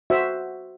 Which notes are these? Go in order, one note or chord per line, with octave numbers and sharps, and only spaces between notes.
F#4 C5 E5